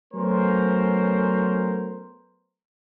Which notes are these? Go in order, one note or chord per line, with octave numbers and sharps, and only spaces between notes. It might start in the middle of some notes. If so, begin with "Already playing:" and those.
F#3 A3 B3 C#4 A#4 C5